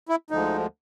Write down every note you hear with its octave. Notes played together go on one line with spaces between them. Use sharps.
E4
D2 D3 F3 G#3 D#4